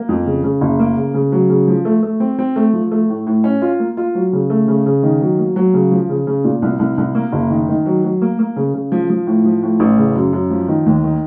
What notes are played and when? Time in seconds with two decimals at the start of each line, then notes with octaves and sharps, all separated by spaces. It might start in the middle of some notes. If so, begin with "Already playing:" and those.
Already playing: A#3
0.09 F2
0.26 C#3
0.44 C#3
0.61 F#1
0.80 A#3
0.97 C#3
1.14 C#3
1.32 F#3
1.50 C#3
1.68 F3
1.85 A3
2.03 A3
2.20 C4
2.39 C4
2.56 A3
2.73 F3
2.92 A3
3.09 A2
3.27 A2
3.44 C#4
3.62 F4
3.80 A#3
3.97 F4
4.15 F#3
4.33 C#3
4.50 A3
4.68 C#3
4.86 C#3
5.03 D#3
5.21 F#3
5.39 A#3
5.56 F#3
5.74 C#3
5.92 F3
6.09 C#3
6.27 C#3
6.44 A#2
6.62 C2
6.79 C2
6.98 C2
7.15 A#3
7.32 F#1
7.50 D#3
7.68 D#3
7.86 F#3
8.04 F#3
8.22 A#3
8.39 A#3
8.56 C#3
8.74 C#3
8.92 F3
9.10 F3
9.27 A2
9.45 F3
9.63 A2
9.80 A1
9.98 C#3
10.15 F#2
10.33 F#2
10.50 F3
10.68 D#3
10.86 D#2
11.04 D#3